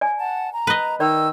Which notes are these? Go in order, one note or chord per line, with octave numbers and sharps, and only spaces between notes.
D5 G#5
F#5 A5
A#5
B4 D#5
D#3 D5 E6